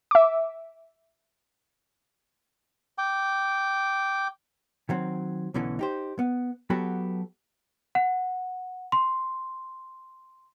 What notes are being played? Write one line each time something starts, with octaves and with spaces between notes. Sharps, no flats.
E5 D6
G5 D6
D#3 F#3 C4
B1 B2 D3 E3 C#4
D#4 G4 C5
B3
F#3 B3 F#4 G4 A4 B4
F#5
C6